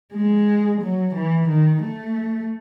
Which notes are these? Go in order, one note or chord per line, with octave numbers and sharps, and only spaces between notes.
G#3
F#3
E3
D#3
A3